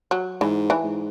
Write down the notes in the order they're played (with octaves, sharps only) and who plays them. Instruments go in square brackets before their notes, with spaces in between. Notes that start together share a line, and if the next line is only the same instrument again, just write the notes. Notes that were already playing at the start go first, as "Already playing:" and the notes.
[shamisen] F#3
[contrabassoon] G#2 [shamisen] E3
[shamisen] E3
[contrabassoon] G#2